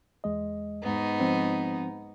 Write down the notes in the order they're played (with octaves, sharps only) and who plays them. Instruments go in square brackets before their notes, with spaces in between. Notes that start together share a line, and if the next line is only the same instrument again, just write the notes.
[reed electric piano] E2 G#3 D#5
[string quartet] G#2 B3 D#4
[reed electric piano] F3 C4